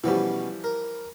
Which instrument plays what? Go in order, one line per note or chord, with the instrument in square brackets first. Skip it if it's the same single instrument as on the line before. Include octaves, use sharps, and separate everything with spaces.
[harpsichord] B2 B3 C#4 [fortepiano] E3 F3 G3
[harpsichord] A#4